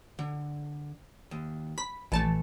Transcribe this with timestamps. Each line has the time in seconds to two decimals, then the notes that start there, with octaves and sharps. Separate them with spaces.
0.19 D3
1.31 D#2
1.78 B5 B6
2.12 A#1 E3 A3 A5